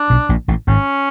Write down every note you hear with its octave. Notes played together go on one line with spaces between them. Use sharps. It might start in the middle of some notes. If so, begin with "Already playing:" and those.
Already playing: D4
B1 B2
A#1 A#2
A1 A2
G#1 G#2 C#4